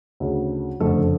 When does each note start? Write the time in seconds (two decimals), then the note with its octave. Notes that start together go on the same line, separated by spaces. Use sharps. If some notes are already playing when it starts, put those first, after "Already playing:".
0.20 D2 C#3
0.80 F#1 F2 D3 A3 A4